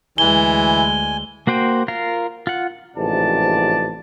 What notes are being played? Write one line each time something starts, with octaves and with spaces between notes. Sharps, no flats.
D2 E3 G#3 G#5 G7
A#3 F#4 C5 G5
F4 A#4 F5
F4 F#5
A1 G#2 C3 F3 D5 A5